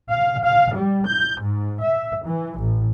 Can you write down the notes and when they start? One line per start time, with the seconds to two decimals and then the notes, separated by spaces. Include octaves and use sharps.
0.10 F5
0.45 F5
0.75 G3
1.06 G6
1.41 G#2
1.83 E5
2.26 E3
2.58 A1